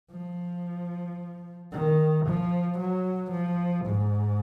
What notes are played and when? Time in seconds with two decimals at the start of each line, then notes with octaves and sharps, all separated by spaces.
0.11 F3
1.72 D#3
2.26 F3
2.79 F#3
3.32 F3
3.86 G#2